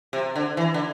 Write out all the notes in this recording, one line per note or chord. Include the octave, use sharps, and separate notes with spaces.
C3
D3
E3
D3